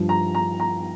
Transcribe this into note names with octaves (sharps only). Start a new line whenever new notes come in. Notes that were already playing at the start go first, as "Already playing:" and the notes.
Already playing: G2 F3
A#5
A#5
A#5